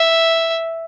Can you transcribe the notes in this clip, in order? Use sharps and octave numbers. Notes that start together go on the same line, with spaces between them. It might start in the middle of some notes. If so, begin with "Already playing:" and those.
Already playing: E5